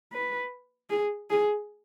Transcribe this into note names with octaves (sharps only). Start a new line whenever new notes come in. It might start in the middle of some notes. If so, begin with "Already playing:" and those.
B4
G#4
G#4